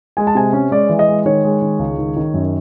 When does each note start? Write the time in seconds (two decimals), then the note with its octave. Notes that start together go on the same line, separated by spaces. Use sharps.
0.17 G#3 G#5
0.27 A5
0.35 C3 G#5
0.53 C#4
0.71 G#3 D5
0.89 E3
0.99 D#5
1.08 G#3
1.25 D#3 C#5
1.44 G#3
1.62 D#3
1.79 C#2
1.98 D#3
2.16 D#3
2.34 F#2